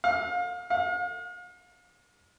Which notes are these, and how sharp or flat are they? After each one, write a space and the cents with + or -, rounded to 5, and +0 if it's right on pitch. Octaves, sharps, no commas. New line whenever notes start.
F5 +35
F5 +45